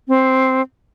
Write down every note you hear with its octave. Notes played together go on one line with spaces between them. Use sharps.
C4